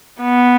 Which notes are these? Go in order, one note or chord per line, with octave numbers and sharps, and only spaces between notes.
B3